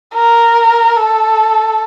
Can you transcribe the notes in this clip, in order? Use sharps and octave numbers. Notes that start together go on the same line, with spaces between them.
A#4
A4